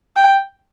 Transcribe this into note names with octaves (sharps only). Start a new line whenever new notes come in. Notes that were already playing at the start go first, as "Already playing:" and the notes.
G5